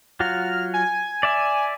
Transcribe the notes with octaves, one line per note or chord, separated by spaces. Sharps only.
F#3 F4 F#4 F6
G#5
D5 E5